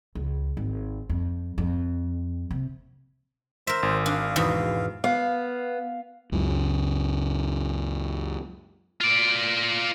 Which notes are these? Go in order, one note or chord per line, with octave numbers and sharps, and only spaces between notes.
C#2
G#1
F2
F2
C3
A#4 C5 E5
G#1
D4 F5
E2 G#2 B2
B3 F5
C#2 F#2 C#3
F4 D5